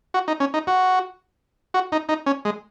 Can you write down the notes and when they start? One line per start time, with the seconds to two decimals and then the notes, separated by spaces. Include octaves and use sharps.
0.14 F#4
0.28 D#4
0.40 C#4
0.54 D#4
0.67 F#4
1.74 F#4
1.92 D#4
2.09 D#4
2.26 C#4
2.45 G#3